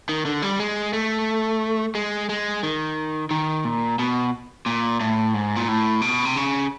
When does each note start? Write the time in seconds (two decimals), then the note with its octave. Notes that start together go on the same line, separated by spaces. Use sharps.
0.09 D#3
0.25 D3
0.42 G3
0.60 G#3
0.93 A3
1.95 G#3
2.29 G#3
2.63 D#3
3.31 D#3
3.65 A#2
3.99 B2
4.66 A#2
5.00 A2
5.34 G#2
5.56 A#2
5.68 A2
6.02 B2
6.25 C3
6.36 C#3